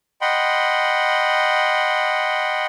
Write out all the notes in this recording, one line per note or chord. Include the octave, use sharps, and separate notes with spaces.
D#5 F#5 G5 B5 C6